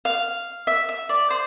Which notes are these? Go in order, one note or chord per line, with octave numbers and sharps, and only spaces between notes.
F5
E5
E5
D5
C5